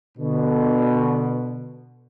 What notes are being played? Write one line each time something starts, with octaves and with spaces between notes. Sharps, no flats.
B2 D3